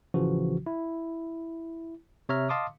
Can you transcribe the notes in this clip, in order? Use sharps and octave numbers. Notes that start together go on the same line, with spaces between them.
A1 C#3 E3 F3 F#4
E4
C3 C#5 E5 A#5 F6
D#5 F5 A5 C6 D6 D#6